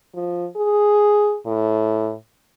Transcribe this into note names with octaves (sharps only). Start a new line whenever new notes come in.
F3
G#4
A2